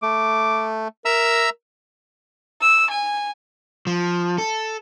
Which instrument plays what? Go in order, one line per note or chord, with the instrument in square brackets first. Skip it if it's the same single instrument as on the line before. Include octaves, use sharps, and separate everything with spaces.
[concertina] A3 [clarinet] D6
[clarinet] A#4 [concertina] E5 A#5 E6
[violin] E6
G#5
[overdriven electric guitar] F3
A4